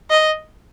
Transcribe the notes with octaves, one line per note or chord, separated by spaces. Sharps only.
D#5